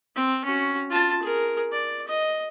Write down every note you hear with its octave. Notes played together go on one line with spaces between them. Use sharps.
C4
C#4 F#4
F4 A5
G#4 A#4
D5
D#5